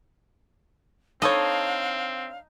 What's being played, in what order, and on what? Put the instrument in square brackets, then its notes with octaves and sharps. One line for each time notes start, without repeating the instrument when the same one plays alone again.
[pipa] D3 A4 C#5 [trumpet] C4 [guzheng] D#4 D#5 A5 [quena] F5